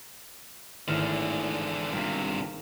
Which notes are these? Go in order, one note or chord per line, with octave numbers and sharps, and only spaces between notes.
G#1 E2 A2 D3 F6
G1 G2 C3 A#3